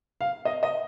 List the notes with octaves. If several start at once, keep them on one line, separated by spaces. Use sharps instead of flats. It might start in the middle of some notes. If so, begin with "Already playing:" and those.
F5
D#5
D#5